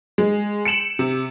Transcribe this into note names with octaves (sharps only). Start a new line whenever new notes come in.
G#3
C#7 D7 E7 F#7
C3